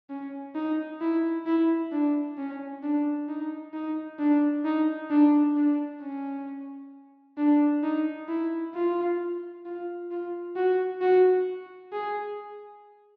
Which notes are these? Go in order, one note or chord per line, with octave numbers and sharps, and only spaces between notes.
C#4
D#4
E4
E4
D4
C#4
D4
D#4
D#4
D4
D#4
D4
D4
C#4
D4
D#4
E4
F4
F4
F4
F#4
F#4
G#4